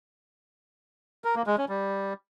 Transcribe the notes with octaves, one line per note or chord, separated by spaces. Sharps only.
A#4
A#3
G#3
C#4
G3